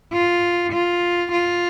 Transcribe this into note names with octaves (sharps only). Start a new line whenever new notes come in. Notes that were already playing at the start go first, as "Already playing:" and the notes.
F4
F4
F4